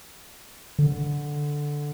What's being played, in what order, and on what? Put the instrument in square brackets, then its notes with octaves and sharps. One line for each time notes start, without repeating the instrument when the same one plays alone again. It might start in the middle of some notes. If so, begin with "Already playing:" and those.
[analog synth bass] D3